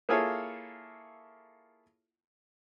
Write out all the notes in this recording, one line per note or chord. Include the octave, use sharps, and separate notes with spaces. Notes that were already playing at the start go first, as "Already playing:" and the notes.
A#3 E4 F4 G#4 A4 C#5